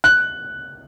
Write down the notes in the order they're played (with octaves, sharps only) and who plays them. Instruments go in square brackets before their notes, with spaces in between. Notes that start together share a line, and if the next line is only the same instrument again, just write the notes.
[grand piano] F#6